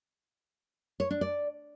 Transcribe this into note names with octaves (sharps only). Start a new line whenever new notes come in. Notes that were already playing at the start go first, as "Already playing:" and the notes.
C#5
D4
D5